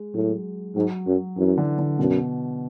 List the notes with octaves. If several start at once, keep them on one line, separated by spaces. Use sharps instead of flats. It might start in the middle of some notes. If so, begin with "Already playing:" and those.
Already playing: G#3
A2 F#3
G#2 F#3
F#2
F#2 E3
D3
D3
F#2 B2